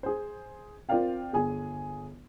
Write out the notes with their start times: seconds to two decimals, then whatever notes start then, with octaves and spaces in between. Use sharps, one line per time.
0.03 G#4 C5
0.89 C4 F4 A#4 D5 F5 G5
1.33 G1 G#4 G#5